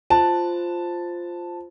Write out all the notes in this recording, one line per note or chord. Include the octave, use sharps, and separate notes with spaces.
F4 C5 A5